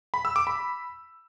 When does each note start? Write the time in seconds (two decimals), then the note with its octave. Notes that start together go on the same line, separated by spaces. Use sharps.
0.14 B5
0.25 E6
0.36 D6
0.47 B5